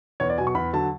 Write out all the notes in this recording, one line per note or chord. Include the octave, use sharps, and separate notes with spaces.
E2 C#5
D5
B2 F#3 G#5
C#6
E2 B5
D3 F#3 A5